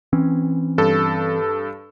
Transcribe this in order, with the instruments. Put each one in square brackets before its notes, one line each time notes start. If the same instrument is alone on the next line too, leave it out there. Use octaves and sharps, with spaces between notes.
[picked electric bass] E3 C4 C#4
[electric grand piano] G2 A4